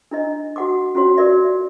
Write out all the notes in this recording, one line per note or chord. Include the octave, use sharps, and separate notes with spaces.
D4 E4 D#5
F#4 F#5 D6
C#4 F4 F#4 C#5
F#4 A#4 D5 E5